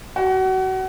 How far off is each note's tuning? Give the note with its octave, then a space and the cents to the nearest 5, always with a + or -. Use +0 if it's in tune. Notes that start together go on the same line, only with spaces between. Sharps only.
F#4 +30